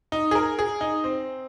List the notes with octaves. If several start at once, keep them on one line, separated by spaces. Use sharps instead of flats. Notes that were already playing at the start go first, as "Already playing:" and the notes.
D#4
G#4
A#4
G#4
D#4
C4